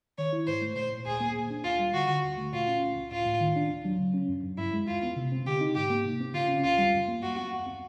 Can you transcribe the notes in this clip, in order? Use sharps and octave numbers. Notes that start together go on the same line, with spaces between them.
D#3 C#5
E4
G#2 C5
A3
A#2 C5
A#2
D2 G#4
A#3
A#2
D4
D2 F4
G3
D3 F#4
D3
D2
A3
A#2 F4
C#4
C#2
C#2
A2 F4
A2
D#3
D4
D2
F#3
C#3
C#4
F#2
F#2
G2 E4
G#3
D#2 F4
B3
C3
C4
D3 G4
D#4
G#2 G4
A#3
C3
C4
C#3 F4
C#4
D2 F4
G3
F#2
A#3
F#2 F#4
B3
D#2
C4